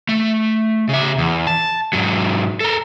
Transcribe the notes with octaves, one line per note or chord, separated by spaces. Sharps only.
A3
C#3 E5
E2
A5
G#2 F#3
A4 A#4